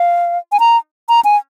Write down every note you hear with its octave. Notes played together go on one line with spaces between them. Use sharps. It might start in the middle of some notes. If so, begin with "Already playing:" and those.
Already playing: F5
G#5
A#5
A#5
G#5